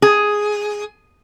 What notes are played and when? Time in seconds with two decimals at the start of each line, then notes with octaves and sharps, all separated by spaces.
0.02 G#4